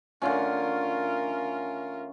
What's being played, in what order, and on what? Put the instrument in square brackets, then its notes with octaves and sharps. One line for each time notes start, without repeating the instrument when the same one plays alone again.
[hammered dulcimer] D3 A3 C#4 [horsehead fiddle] F4 A#4